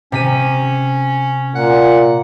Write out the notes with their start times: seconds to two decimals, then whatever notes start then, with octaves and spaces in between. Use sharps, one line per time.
0.12 C3 C#4 B6 D#7
1.55 A#2 F#5